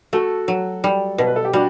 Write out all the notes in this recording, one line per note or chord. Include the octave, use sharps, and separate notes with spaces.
A3 F#4 A4
F#3
G3
B2
B4
A4
G4
G3 D4 F#4